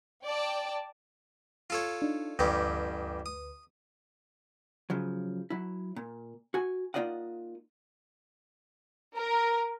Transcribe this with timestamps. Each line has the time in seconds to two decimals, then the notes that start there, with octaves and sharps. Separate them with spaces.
0.24 D5 G5 A5
1.70 F4 A4 C#5
2.02 D4 D#4
2.39 A1 D2 G2 G4 B4
3.26 D#6
4.90 C#3 F3 F#3
5.50 F#3 E4
5.96 A#2
6.54 F#4 G#5
6.94 A#3 D#4 F4 D5 D#5 F#5
9.16 A#4